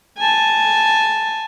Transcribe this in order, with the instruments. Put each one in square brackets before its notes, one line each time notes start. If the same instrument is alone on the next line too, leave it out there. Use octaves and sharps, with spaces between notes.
[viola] G#5 A5